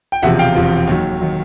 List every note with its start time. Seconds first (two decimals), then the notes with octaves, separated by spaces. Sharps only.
0.12 G5
0.22 E1 E2 C3 F3 E5 F#5
0.39 F5 G5
0.55 E1 E2 C3 F3
0.87 D#2 D#3 F#3
1.20 D#3 F#3